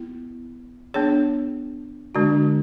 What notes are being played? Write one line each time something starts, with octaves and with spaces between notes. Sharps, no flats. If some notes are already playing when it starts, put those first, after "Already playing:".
Already playing: B3 E4
B3 D4 G#4 C#5
D3 G#3 D4 F#4